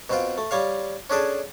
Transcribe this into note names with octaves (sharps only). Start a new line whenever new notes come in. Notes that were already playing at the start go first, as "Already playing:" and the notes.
B2 C4 F4
A3
G3 C#5 F5
C#4 D4 G#4 A4